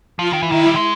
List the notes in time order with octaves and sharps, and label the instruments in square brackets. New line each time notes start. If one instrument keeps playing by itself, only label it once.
[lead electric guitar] F3 [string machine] F4
[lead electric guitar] D#3
E3
[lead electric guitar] D#3 [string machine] E4
[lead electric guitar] G3
G#3